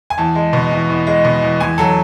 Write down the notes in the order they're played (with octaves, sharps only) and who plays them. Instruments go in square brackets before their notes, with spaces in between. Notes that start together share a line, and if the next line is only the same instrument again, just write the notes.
[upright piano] G#5
E2 A5
G#3
B2
E2
E2
G#3
B2
E2
E2 G#5
F#3 A4